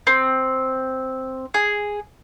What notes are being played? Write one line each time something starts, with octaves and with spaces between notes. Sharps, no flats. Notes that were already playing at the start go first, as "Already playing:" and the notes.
C4
G#4